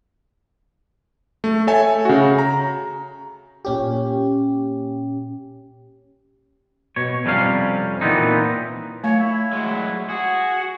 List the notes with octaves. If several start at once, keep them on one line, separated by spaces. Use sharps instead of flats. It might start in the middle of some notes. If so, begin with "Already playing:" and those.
A3
A4 C#5 E5 G#5
C#3 F#4
A#5
A#2 C#4 G4
B2 C#5
F2 C3 G3 C#4 F5
A#2 E3 B3 C4 D#4
A3 C#5 F5
E4
F#3 G#3
F#4 G#4